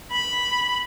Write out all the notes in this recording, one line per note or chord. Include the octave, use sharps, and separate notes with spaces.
B5